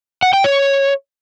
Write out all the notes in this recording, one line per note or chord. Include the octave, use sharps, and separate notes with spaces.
F#5
G5
C#5